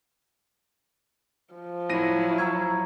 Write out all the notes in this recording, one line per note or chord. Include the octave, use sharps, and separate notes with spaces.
F3
A2 F#3 E4 A#6 D#7
A#5 C#6 E6 G#6